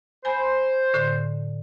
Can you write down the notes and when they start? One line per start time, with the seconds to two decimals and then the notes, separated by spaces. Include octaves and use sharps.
0.25 C5 G#5 B5
0.94 A2 D3